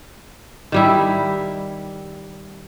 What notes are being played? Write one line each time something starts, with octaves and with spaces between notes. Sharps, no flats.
D#3 G3 E4